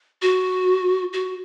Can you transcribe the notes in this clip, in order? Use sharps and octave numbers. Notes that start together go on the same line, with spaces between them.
F#4
F#4